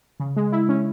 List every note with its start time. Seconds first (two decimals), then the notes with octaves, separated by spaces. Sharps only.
0.20 C#3
0.37 G#3
0.52 E4
0.69 C#4